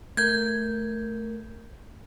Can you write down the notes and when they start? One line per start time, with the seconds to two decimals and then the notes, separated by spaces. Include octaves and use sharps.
0.17 A3 A#4 G6 G#6